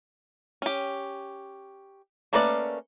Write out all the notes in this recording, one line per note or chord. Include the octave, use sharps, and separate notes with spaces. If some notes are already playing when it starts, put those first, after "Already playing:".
C#4 G4
A3 A#3 C#4 B4 D5